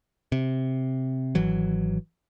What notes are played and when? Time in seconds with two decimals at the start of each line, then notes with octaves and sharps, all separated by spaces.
0.32 C3
1.35 G#1 E3 F#3